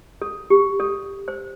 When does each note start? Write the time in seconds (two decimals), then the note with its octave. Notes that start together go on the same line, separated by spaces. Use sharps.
0.22 A4
0.50 G4
0.80 A4
1.28 C5